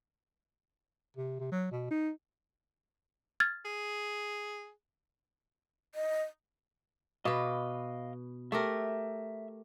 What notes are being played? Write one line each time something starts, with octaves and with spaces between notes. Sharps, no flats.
C3
C3
F#3
B2
D#4
F6 G#6 A6
G#4
D#5
B2 B4 D#5 F5 D6
A3 G4 A#4 E5